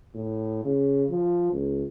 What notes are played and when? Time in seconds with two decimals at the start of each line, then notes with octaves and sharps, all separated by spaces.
0.14 A2
0.65 C#3
1.09 F3
1.52 C#2